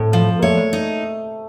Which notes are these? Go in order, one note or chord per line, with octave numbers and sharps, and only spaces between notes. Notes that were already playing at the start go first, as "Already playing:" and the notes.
Already playing: A2 C4
F3
A#3
A3 C#5
D#4